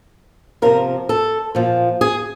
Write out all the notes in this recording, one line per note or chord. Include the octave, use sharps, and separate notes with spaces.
C3 F3 A#4
A4
A#2 F3
G#4